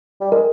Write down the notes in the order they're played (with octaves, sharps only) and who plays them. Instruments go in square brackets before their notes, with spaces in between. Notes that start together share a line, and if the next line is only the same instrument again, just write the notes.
[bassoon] G3
[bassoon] G#3 [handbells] A#4